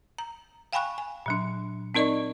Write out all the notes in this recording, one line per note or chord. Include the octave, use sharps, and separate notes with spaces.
A#5
F5 G5 G#5 B5 C#6 F#6
G#5
A#2 F#3 D4
C4 D#4 A#4 D5 D#5 C#6